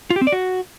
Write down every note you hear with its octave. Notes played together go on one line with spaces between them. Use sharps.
F4
G4
C4
D5
F#4